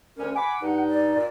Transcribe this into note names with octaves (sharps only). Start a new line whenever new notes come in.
D2 C#4 A#4
F#5 G#5 B5 D6
G2 D#4
D5
A#2